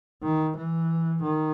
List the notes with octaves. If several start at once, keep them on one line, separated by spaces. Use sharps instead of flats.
D#3
E3
D#3